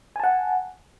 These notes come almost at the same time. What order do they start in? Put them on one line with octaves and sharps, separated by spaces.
G#5 A5 F#5